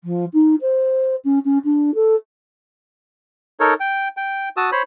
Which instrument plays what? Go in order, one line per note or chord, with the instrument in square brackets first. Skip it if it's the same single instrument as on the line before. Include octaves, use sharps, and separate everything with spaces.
[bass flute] F3
D#4
C5
C#4
C#4
D4
A4
[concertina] D#4 A4 A#4 C#5
G5
G5
F#4 A5 D#6 E6
C5 C#5 B5